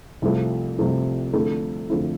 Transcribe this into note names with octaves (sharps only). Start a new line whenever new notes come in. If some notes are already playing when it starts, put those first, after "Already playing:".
C2 C3 F3 A3 E4
C2 C3 F3 A3 E4
D3 F3 A3 C4 E4
D3 F3 A3 C4 E4